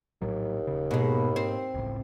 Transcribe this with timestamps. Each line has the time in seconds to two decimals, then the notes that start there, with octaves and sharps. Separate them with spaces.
0.22 A#1 D#2 A2 F#3
0.67 D#1 C#3
0.91 G#2 B2 G#3 A#3
1.36 C4
1.74 G1 C#2 A2